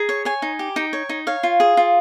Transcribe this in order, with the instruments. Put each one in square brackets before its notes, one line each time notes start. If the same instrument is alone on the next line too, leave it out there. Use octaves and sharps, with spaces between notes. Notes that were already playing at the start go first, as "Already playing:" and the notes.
Already playing: [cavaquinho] G#4 A#5
C#5
C#5 G#5
D#4
G4
D#4 G5
C#5
D#4
C#5 F5
F4
G#4
F4